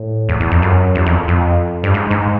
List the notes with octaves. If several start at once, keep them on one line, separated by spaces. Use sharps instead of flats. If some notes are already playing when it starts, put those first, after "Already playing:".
Already playing: A2
E2
E2
F2
F#2
E2
F2
F2
G2
G#2
G#2